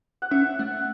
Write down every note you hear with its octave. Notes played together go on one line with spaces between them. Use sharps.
F#5
C#4 E5
A3 F#5